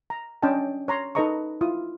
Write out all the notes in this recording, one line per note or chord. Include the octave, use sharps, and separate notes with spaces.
A#5
C#4 D4 D#5 G5 A5
C#5 A#5 C6
D#4 A4 B4 D#5 A#5 C#6
E4 F4 D#6